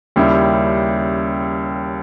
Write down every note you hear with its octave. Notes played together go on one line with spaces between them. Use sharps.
D#2 C#3 G3 C#4 E4